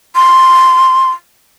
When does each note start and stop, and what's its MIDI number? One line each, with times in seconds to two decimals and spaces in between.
0.15 1.11 84